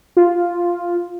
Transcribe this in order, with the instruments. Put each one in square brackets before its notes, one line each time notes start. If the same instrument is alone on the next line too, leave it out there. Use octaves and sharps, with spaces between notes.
[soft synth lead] F4